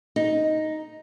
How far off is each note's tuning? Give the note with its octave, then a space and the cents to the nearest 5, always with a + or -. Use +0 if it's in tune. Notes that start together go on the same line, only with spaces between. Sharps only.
D#4 +0